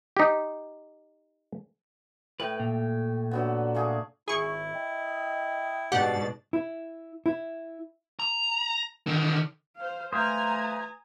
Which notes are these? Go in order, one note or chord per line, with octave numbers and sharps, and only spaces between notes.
D#4 G4
A2 B4 G5
A#2
D3 F#3 B3
A3 A#3 G#4
G#1 E4 G#4 C#6
D#5 G5
G#2 B2 D4 G4 D5 F#5 A6
E4
E4
A#5
D3 D#3
C5 F5
A3 B4 C5 F5 G5 G#5 A#5 D#6